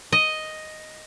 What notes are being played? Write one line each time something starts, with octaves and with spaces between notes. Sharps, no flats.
D#5